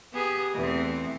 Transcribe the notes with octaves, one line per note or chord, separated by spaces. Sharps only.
B3 G4 G#4
E2 A3 C4